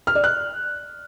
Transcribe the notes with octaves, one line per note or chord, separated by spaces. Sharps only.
F6
D5
F#6